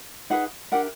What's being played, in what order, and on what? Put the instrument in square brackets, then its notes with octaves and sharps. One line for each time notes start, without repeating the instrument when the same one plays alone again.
[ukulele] D#4 G#4 B4 F#5
D4 G4 A#4 F#5